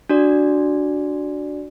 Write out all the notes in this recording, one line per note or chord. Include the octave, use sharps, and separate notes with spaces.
D4 F#4 D5